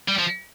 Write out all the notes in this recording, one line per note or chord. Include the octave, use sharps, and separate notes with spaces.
G3
F3